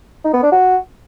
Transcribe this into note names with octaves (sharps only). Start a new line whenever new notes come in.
D#4
B3
D4
F#4